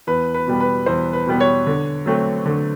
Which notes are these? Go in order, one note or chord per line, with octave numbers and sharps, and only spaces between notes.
E2 B4
B4
B2 G3 B3
B4
E2 C5
B4
B2 G3 B3
C#5
D3
F#3 A3 C4
D3